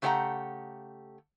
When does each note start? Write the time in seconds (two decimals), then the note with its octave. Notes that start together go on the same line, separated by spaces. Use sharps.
0.02 C#3 A3 G4 C#5 F#5 A#5